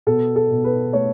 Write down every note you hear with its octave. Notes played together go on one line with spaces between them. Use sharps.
B2 A4
A4
B2
B4
A3 C#5